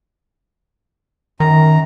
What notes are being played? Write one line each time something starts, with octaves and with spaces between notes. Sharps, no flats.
F#2 D#3 A#5